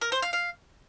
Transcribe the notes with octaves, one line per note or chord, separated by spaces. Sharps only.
A#4
C5
F5
F5